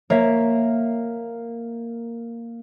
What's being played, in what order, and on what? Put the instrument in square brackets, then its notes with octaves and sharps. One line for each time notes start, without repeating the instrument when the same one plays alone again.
[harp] A#3 [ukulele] C#5 E5